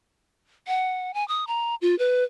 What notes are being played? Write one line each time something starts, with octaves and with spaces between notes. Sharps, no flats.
F#5
G#5
D#6
A#5
F4
B4